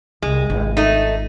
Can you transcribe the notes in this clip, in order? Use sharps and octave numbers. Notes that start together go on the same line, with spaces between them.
C2 G#3
G#1 F4
A3 D#4